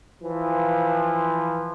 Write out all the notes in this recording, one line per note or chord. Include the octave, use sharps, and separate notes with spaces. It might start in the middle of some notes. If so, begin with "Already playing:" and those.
E3 F3